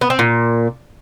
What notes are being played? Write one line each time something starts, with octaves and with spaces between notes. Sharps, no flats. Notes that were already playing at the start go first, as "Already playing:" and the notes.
B3
C4
A#2